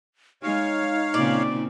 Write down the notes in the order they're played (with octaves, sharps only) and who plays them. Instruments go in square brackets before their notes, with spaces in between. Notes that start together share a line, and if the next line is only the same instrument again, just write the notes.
[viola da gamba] G#3 [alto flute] D#4 [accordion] C#5 F5
[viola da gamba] A#2 C#3 C4 [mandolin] D5